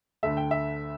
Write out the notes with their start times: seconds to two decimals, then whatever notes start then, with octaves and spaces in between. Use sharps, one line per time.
0.23 D2 D3 A3 E5
0.37 G5
0.51 E5